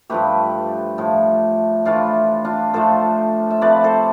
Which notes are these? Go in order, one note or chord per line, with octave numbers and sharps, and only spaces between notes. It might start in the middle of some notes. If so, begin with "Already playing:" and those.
G2 F3 A3 G4 B4
A2 F3 A3
A2 E3 A3 D4 F4
D4 F4
A2 F3 A3 A4 C5
E5
C3 F3 A3 B4 D5
A4 C5